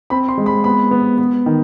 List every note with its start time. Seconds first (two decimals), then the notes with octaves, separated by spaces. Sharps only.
0.10 C4 B5
0.29 C6
0.37 G#3
0.46 B5
0.64 B3 B5
0.91 B3
1.18 B3
1.46 D#3